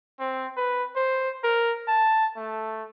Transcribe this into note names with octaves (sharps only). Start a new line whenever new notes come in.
C4
B4
C5
A#4
A5
A3